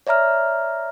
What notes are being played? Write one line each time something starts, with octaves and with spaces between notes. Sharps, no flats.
C#5 D5 E5 A#5 F6